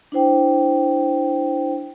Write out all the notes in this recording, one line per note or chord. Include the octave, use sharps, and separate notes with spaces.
D4 E4 C5 G5